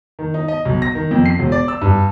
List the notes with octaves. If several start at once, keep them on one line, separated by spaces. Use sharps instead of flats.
D#3
D#4
D#5
B1
A#6
D#3
F2
C7
E1
D5
E6
G2